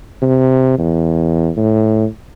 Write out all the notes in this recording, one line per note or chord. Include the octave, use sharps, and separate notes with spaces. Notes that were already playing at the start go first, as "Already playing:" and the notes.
C3
E2
A2